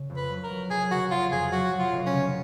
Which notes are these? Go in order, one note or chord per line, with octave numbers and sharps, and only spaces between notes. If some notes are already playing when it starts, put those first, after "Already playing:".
Already playing: C#3
F2
B4
F#3
A#4
F#3
F1 G#4
C#3 F#4
F1 F4
F2 G#4
F#3 F#4
F#3
F4
F1
C#4
C#3